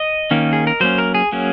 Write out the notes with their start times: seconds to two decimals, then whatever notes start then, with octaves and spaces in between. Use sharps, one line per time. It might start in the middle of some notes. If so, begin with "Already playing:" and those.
Already playing: D#5
0.31 D#3 A#3 C#4
0.53 G#4
0.67 A#4
0.80 F#3 A#3 C#4 C5
0.98 A#4
1.15 G#4
1.32 F#3 A#3 C#4